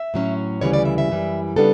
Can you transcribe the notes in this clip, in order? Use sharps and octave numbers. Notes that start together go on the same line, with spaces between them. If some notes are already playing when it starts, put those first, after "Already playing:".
Already playing: E5
A2 F#3 C#4
D2 C#3 E3 G3 C#5
D5
E5
E5
F#2 E3 G3
C#3 G3 B3 D4 A4